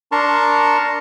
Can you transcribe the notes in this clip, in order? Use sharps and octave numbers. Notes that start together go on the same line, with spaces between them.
D4 A#4 A5 A#5 C6 C#6